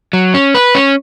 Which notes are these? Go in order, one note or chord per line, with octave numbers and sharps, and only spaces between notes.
F#3
C#4
B4
C#4